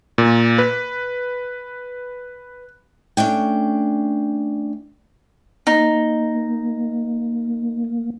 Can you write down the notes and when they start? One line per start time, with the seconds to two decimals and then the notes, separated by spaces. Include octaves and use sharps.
0.18 A#2
0.58 B4
3.17 A3 C#4 D4 G5
5.67 A#3 D#4